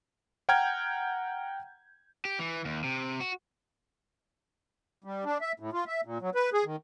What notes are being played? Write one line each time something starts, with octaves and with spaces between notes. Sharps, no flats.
F#5 G5 A#5 F6 G6 G#6
G4
E3
D#2
C3
F#4
G3
D4
E5
A2
F4
E5
A#2
F#3
B4
G#4
D#3